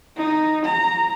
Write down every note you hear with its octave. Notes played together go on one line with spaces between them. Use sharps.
D#4
A#5